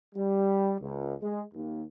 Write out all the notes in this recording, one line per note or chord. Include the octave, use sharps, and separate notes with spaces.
G3
C#2
G#3
D#2